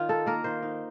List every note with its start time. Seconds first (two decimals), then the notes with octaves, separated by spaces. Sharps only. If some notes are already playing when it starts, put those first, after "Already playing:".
Already playing: D#3 F4
0.09 D#4 A4
0.26 A#3 A#4
0.44 D#3 C5
0.62 D#4